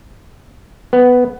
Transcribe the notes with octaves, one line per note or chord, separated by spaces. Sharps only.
B3